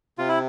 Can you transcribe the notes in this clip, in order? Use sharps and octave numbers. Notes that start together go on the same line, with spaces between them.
C3 F4
E4